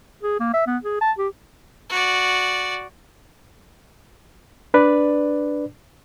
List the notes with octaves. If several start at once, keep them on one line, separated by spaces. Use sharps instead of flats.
G#4
A#3
E5
B3
G#4
A5
G4
F#4 D5
D4 B4 D5